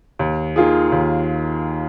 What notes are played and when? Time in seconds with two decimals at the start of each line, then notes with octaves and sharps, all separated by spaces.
0.19 D#2
0.56 D#3 A#3 F4 G#4
0.92 D#2